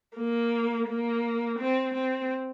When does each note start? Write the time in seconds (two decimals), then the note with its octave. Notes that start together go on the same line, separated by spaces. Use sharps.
0.16 A#3
0.88 A#3
1.59 C4
1.94 C4